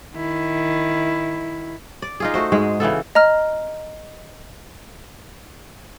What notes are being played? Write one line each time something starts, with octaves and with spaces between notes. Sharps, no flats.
D#3 E4
D5
D#4 F4 G#4
A3 F#4 C5
G#2 G#3 G#4
C#3 E3 B3 A4
D#5 A#5 F6